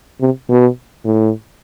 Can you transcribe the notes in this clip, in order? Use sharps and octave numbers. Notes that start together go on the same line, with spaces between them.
C3
B2
A2